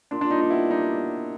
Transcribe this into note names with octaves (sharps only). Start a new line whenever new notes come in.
A#2 D4
D4
G3 D#4
D#4
B3 E4
G3 D#4